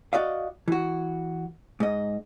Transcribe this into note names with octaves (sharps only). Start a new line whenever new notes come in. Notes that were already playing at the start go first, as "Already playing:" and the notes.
F#4 D5 D#5 F5
E3 F#4
G#2 D#5